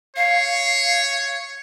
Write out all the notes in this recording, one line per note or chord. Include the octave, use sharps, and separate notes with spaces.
C#5 F5